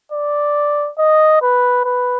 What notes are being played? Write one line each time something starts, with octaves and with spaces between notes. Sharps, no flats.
D5
D#5
B4
B4